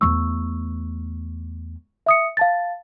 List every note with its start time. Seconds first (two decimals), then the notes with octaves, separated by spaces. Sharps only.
0.01 E2 A3 C#6 E6
2.06 E5 D#6 C#7
2.37 F5 A5 A6